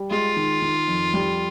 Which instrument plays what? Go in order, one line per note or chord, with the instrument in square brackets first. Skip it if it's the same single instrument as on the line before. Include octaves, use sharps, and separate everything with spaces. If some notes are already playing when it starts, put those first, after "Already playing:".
Already playing: [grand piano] G3
[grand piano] G#3 [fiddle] F4
[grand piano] D#3
D#3
F2
G3